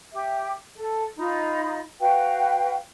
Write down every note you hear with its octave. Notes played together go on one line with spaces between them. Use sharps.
G4 E5
A4
D#4 F4 A#5 B5
F#4 B4 F5 G5